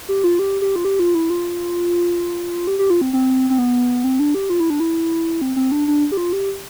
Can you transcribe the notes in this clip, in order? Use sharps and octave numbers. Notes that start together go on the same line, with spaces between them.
G4
F4
G4
G4
F4
G4
F4
E4
F4
G4
G4
F4
C4
C4
C4
B3
C4
D4
G4
F4
E4
D4
E4
C4
C4
D4
D4
G4
F4
G4